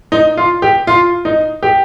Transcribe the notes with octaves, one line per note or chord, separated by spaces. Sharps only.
D#4
F4
G4
F4
D#4
G4